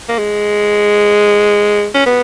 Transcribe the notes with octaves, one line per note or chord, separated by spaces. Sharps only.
A#3
G#3
C#4
B3